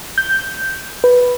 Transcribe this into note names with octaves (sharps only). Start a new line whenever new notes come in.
G6
B4